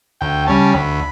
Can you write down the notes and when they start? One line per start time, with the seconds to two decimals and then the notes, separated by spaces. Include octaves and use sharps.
0.21 D2 G5
0.47 C#3 G3 C#4 A5
0.74 D2 B5